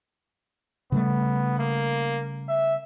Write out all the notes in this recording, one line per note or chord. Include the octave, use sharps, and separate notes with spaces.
C#3 G3 A3 B3
A#3
E5